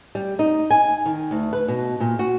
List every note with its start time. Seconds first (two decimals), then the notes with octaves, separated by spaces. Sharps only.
0.15 G3
0.39 D#4
0.71 G#5
1.06 D#3
1.31 D2
1.53 B4
1.68 B2
2.00 A#2
2.19 F#4